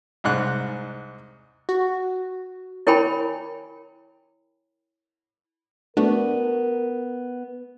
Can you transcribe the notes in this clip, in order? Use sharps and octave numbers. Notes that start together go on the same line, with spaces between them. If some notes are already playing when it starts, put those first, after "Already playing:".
C2 G#2 F#6
F#4
E4 A#4 C#5 G5 G#5 B5
A3 B3 D4 F#4 A#4